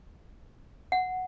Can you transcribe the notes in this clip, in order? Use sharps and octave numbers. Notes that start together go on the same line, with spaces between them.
F#5